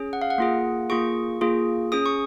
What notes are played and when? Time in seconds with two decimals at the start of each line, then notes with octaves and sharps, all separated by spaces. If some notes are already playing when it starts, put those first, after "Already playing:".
Already playing: C#4 G#4
0.13 F#5
0.22 F5
0.30 F#5
0.38 A#3 F4 G#4
0.90 A#3 F4 G#4 C#6
1.41 A#3 F4 G#4
1.92 C#4 G#4 D#6
2.06 C#6